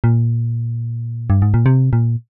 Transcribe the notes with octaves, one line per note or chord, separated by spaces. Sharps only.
A#2
G2
G#2
A#2
C3
A#2